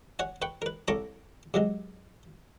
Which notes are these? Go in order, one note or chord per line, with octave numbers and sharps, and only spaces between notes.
C#5 F#5 G#5
B4 G5 C#6
A#4 B4
C2 A4 C#5 A#5 C#6 D6
C3 F#3 G#3